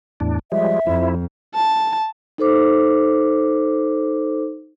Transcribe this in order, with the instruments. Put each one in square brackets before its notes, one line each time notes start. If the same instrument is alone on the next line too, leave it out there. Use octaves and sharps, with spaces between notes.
[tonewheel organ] E2 A2 D4
[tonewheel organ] F3 G3 G#3 [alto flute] E5
[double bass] F2 [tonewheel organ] F3 E4
[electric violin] A5
[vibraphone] D#4 A4 C5 D6